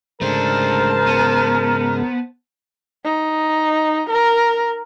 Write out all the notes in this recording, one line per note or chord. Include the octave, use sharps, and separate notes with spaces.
G#2 C#3 G#3 A3 D4 A#4 C5 A5
B3
D#4
A#4